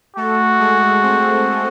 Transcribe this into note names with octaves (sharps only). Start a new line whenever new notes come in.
A3 F#4 A4
G#3 G#4
C4 C5